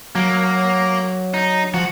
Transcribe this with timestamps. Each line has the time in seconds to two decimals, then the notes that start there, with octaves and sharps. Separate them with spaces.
0.15 F#3 A#3
1.34 D#4
1.74 F3 F#4